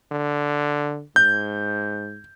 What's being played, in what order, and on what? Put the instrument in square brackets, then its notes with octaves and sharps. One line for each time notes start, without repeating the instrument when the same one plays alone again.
[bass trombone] D3
[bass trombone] G#2 [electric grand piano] G6